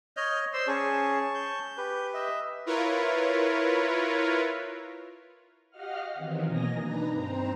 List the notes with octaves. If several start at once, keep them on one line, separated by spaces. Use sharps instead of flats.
C#5 D#5 F6 G6
C5 D5 C6 E6
C#4 G#4 A5 C#6
G6
G4 B4
D#5 E5
E4 F4 A#4 B4 C#5
F#4 G4 D#5 F5 F#5 F6
D#3 E3 F#3 C4
B2 A#3 D#5 G#5 A#5 A#6
D4 D#4 B4 A#5
G2 C4 C5 A#5